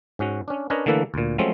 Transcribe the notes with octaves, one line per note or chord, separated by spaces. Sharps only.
G#2 C#4 F#4
C#4 D4
C#4 D4 A#4 B4 C#5 D#5
D3 E3 A3 A#3 A4 B4
D2 A#2
F3 F#3 G#3 A3 C4 C#4